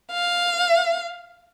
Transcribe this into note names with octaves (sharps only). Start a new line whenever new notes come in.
F5